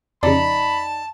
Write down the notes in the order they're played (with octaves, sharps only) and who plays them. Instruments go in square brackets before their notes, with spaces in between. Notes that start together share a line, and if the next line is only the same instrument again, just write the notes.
[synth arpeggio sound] F2 C#3 [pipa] D#4 D5 [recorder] A5 [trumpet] B5